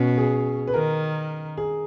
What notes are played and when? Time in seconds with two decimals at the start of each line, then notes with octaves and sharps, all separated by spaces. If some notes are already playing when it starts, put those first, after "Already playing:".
Already playing: B2 C#4
0.18 G#4
0.67 B4
0.74 D#3 A#4
1.57 G#4